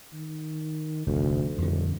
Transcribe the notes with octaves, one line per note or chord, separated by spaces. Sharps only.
D#3
F1 D2
D#1 F2 D3